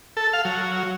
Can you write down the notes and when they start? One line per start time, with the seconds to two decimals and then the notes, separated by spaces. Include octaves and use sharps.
0.17 A4
0.33 F5
0.45 F#3